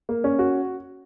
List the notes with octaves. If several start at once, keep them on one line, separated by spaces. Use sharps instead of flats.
A#3
C#4
F#4